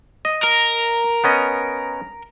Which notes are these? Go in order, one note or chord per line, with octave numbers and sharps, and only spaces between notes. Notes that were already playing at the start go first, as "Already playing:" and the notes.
D#5
A#4
B3 C#4 D#5